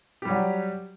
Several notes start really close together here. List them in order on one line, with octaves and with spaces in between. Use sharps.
G4 G3 F#3